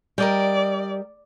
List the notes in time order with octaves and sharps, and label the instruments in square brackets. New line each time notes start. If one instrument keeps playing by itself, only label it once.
[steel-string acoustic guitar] G3 [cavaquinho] A#4 D#5 G5 [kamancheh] D5